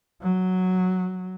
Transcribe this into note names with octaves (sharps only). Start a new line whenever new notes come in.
F#3